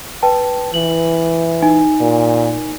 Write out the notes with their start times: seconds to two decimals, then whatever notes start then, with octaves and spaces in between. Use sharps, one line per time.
0.23 B4 G5 A5
0.74 E3 F#7
1.62 D#4 G#5
2.00 A#2